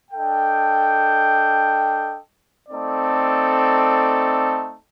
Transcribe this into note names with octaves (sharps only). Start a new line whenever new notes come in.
D4 A4 D#5 G5
A3 C4 D#4 A4 D5